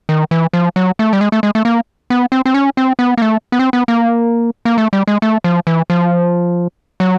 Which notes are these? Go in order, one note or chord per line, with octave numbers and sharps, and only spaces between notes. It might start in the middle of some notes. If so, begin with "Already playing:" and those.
D#3
E3
F3
F#3
A3
G3
G#3
A3
G#3
A3
A#3
B3
C4
C4
C#4
C4
B3
A#3
A3
B3
C4
B3
A#3
A#3
A3
G3
G#3
A3
F3
E3
F3
F#3